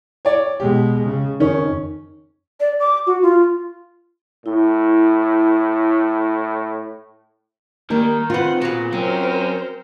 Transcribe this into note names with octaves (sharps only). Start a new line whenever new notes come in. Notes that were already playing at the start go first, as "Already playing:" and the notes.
C#5 D5
B2 G#3 G4
C#3
F2 D#3 C#4
D5
D6
F#4
F4
A2 E4
D#3 G3 A#3 A#4
C4 F4 B4 F#5 C6
A#2 B3 F#4 G#4 F5
F#3 C4 C#4 A#4 C5